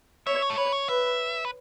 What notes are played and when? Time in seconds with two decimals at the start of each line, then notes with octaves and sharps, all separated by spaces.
0.27 C#5 E5
0.42 C#5
0.50 A4
0.58 B4 C#5
0.73 C#5
0.88 B4 E5
1.45 B4